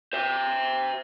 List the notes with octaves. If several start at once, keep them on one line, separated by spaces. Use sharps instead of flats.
C5 E5